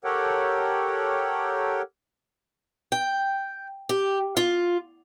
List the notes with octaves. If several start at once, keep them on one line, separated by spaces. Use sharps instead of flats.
G4 A4 A#4 C#5 F#5 G5
G5
G4
F4